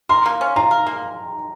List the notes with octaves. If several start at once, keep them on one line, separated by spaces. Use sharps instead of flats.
A#4 C6
A#3
C#4
F4 A#5
A#4
A#3